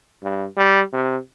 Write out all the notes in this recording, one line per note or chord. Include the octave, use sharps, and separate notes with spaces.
G2
G3
C3